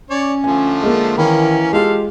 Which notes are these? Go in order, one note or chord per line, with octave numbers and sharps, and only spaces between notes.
C#4 C#5 D5
D3 F3 A3 G#5
G#3 A#3
D#3 E3 A#3 C#4 B5
G#3 F4 G4 A4 F5